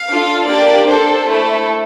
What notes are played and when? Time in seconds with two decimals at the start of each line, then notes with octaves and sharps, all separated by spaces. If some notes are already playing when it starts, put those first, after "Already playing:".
Already playing: F5
0.11 D4 F4 A4
0.49 A#3 D4 G4 D5
0.88 D4 A4 C5
1.27 A3 E4 A4